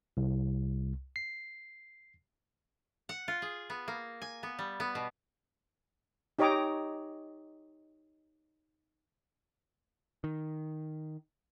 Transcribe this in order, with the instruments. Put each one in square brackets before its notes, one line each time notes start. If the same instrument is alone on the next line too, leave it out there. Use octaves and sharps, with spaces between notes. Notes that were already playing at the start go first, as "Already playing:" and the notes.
[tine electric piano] C2
C7
[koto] F#5
F4
G#4
B3
A#3
G#5
B3
G3
B3
B2
[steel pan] D#4 G4 C#5 D#5 A#5 D6
[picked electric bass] D#3